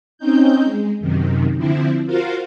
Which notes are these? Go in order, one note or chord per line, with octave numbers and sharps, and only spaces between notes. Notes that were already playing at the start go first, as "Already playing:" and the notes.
C4 C#4 D#4 G6
G#3
F#2 C3 D#3
D3 F3 C4 E4
F4 F#4 A#4 C5 F5